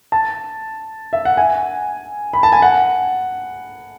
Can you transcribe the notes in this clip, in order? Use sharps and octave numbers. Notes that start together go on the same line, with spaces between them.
A5
E5
F#5
G#5
B5
A5
G#5
F#5